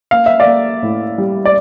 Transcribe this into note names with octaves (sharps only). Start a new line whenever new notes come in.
A#3 F5
E5
D5 F5
A#3
A2
G3
D5